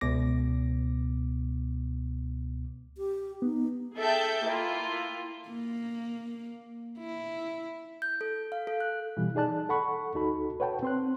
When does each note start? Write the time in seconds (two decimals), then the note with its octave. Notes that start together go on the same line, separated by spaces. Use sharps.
0.01 C#2 B2 B3 D6 A#6
2.98 G4
3.42 B3 D#4
3.96 G#4 A4 E5 G5 A5 G6
4.45 A#3 E4 F4
5.49 A#3
6.98 E4
8.02 G6
8.21 A4
8.52 F5
8.67 A4
8.80 F#6
9.17 B2 E3 G3
9.35 D#4 G#4 D5 A5 F#6
9.69 A4 F#5 B5 C#6
10.15 D2 D#4 F#4 A4 B5
10.60 B4 C#5 F#5 G5 A5
10.83 C4 C6 F#6